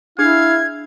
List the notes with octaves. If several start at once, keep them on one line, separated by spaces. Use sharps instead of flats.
D4 E4 G#4 F5 G#6